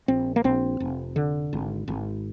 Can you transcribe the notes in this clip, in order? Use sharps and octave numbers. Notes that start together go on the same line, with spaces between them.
A#1 C4
A#3
A#1 C4
F1
D3
G#1
G#1